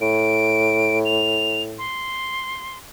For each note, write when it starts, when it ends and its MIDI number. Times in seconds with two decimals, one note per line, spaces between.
0.01 1.86 45
0.01 0.99 98
1.05 1.62 101
1.78 2.78 84